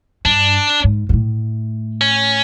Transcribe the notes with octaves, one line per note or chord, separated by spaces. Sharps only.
G2 D4
G#2
G#2
A2
C#4